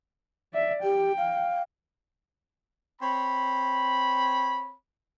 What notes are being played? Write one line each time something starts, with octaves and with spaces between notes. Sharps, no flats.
D5 E5
G4 G5
F5
C4 C#5 B5